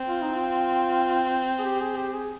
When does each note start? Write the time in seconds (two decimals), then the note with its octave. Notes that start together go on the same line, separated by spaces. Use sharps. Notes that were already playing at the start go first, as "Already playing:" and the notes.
Already playing: C4
0.08 F4
0.22 D#4
0.35 F4
1.59 G#4
1.65 G4
1.81 G#4
1.97 G4
2.14 G#4